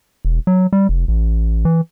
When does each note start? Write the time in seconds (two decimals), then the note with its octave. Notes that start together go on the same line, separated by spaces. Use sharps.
0.25 E1
0.47 F#3
0.73 G3
0.89 F1
1.08 A1
1.65 E3